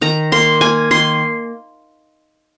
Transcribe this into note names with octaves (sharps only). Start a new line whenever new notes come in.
D#3 A#5
A#3 C6
A#3 G#5
D#3 C6